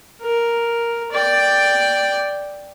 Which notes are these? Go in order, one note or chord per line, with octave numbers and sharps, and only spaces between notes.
A#4
D5 G5